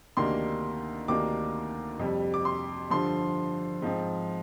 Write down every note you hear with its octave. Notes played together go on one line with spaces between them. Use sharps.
D2 C3 D#3 A#3 D4 C6
D2 C3 D#3 A#3 D4 D6
F2 C3 G3
D6
C6
G2 D3 F3 C6
G#2 F3 C4